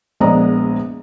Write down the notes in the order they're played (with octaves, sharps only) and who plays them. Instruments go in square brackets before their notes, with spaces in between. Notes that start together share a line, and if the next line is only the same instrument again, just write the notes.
[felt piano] A#1 G#3 B3 D5 D#5 A#5